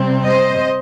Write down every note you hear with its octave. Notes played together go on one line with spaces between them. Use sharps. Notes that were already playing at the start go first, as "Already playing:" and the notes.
Already playing: C3 G3 C4
C5 D#5